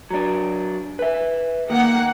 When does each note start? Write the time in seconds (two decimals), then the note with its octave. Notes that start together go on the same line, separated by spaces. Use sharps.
0.11 F#3 D4
0.99 B4 E5
1.70 D#3 A#3 F#5